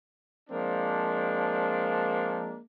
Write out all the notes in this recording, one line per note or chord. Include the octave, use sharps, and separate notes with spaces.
F3 G#3 A#3 C4 D4